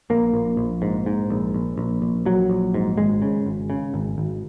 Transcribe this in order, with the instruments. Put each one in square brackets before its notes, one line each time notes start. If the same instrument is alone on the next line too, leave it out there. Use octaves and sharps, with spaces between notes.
[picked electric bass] A#1 A#3
A#1
A#1
G#2
G#2
A#1
A#1
A#1
A#1
A#1 F#3
A#1
G#2
G#1 G#3
C#3
G#1
C#3
G#1
G#1